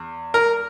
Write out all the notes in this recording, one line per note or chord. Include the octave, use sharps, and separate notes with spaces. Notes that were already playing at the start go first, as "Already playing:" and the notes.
Already playing: E2
A#4